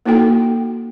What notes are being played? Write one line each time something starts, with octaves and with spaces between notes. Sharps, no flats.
A#3 D#4 E4 F#4 A4 G5